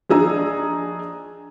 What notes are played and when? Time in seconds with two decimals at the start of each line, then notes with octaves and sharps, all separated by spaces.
0.10 A#1 D4 D#4 G#4 A#5 E6